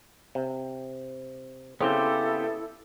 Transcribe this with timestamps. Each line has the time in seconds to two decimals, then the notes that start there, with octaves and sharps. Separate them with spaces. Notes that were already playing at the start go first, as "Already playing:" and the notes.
0.35 C3
1.81 C#3 B3 C4 E4 G4 A4 C5